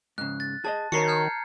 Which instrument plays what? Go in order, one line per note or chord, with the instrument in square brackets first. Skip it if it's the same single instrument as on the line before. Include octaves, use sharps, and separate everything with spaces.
[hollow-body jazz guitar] G#2 C#3 [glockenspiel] F#6
[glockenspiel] A6
[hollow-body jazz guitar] G#4 D5 D#5 [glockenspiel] A5
[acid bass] D#3 [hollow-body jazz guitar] F#4 A#4 C#5 [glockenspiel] A#5 C7 C#7
[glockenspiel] F6 G6 G#6